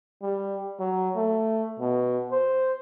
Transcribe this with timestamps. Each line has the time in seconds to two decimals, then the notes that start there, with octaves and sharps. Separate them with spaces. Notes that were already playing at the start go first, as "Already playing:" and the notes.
0.22 G3
0.79 F#3
1.16 A3
1.80 B2
2.32 C5